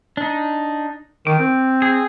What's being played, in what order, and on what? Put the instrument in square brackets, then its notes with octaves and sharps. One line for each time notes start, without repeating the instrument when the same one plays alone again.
[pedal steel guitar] D4 D#4
[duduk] D#3 [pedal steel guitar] D6
[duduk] C4
[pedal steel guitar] G#4